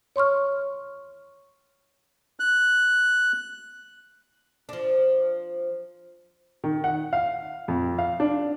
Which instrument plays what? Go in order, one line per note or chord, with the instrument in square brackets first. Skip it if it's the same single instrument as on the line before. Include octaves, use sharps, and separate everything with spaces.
[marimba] C#5 C6 C#6 F6
[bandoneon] F#6
[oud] F3 D4
[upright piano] D#3
F#5
F5
F2
F5
D4